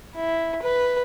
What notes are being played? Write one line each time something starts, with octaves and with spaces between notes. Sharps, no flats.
E4
B4